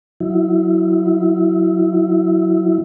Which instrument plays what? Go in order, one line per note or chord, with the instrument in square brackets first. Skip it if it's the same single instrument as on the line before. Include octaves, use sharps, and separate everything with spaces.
[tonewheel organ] F#3 E4